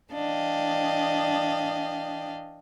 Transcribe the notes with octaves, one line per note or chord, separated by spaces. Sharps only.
E3 D4 D#5 F5 G5